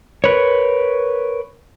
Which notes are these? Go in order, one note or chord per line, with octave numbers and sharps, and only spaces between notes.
A#4 B4 C#5